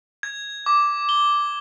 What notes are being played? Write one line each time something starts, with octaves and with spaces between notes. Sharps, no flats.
G#6
D6
G7